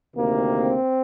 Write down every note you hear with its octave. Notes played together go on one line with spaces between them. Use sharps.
D2 C3 D#3 A#3
C4